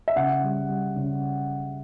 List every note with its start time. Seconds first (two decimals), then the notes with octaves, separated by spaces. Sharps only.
0.08 E5
0.16 C#3 F#5
0.43 G3
0.69 G3
0.96 C#3